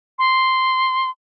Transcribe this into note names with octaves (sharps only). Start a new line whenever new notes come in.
C6